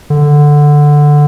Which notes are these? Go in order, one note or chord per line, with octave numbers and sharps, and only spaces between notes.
D3